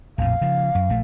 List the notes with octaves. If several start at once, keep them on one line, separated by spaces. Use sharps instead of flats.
A#1 F2 A2 F5
C#3 F3
F#2
A#1 A3